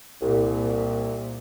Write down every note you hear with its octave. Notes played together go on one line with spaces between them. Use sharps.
C2 A#2